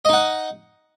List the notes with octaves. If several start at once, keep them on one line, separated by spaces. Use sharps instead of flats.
D#4 D#5 F#5